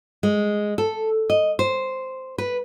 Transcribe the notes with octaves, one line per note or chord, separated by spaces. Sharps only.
G#3
A4
D#5
C5
B4